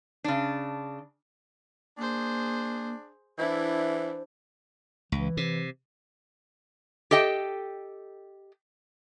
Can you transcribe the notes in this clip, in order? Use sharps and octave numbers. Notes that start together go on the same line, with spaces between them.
C#3 D4
A#3 D4 G#4 C5
E3 D4 E4 C5
C#2 E3
C3
G4 A4 D#5 G5